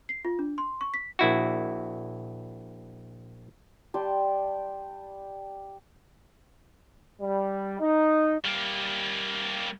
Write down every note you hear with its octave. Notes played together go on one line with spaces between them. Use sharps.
C7
F4
D4
C6
C#6
B6
A#1 E4 F#4
G3 G4 A5 C6
G3
D#4
G3 A#3